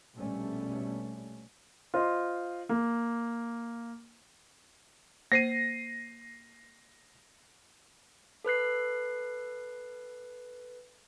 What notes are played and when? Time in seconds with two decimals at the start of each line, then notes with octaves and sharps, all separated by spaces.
0.15 A#1 B2 G3 A3 C#4
1.94 F4 C5 D#5
2.69 A#3
5.32 A#3 C5 A#6 C7 D#7
8.44 A4 B4 F#6 C7